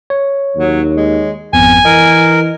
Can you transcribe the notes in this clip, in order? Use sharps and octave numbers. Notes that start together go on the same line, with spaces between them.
C#5
D#2 F#3
G#3
G#1 F2 B3 G#5
E3 A#4 D#5